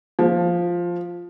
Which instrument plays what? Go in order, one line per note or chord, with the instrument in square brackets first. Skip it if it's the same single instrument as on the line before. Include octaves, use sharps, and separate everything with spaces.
[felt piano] F3